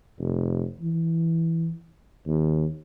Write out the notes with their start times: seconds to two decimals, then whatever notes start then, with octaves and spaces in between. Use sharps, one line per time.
0.19 F1
0.81 E3
2.27 D#2